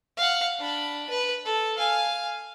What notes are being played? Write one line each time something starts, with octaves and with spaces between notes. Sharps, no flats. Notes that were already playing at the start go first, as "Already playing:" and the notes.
F5 F#5
D4 B5
B4
A4
F5 G#5